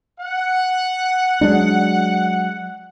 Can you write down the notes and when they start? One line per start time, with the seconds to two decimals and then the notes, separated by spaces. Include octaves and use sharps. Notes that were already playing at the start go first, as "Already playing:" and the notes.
0.19 F#5
1.41 F#3 G#3 D4